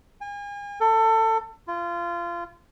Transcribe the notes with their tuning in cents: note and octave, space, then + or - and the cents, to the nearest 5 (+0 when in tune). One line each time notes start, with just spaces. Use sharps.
G#5 -40
A4 +25
F4 -25